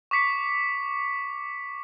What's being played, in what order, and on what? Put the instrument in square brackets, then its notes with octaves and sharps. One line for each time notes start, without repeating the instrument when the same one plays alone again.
[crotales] C#6 D6 B6 C#7